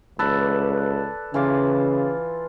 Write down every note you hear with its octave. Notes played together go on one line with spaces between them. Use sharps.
C#2 A4 B4 D5
C#3 E3 F4 D6